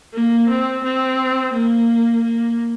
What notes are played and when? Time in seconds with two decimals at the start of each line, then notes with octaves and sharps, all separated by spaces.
0.14 A#3
0.49 C4
0.84 C4
1.54 A#3
2.23 A#3